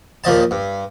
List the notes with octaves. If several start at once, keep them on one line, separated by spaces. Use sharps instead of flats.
D#2 A#2 F3 D#5 A5
G2